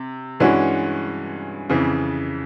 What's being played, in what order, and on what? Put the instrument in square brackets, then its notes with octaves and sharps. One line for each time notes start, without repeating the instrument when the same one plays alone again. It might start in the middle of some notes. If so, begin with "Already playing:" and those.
Already playing: [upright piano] C3
G2 E3 G#3 C#4 F#4
F2 C#3 E3